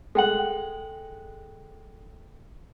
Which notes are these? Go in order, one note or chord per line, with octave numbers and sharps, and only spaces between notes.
G#3 A4 F#5 G5 F#7